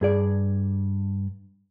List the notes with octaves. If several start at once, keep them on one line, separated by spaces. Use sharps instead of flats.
G2 G#4 D5